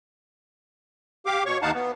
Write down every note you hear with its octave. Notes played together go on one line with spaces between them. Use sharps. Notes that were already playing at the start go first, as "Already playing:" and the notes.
G4 F5 D6
B2 C#5 C#6
D#2 D#4 F5 F#5 A5
B3